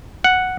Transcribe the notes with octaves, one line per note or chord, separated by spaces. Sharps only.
F#5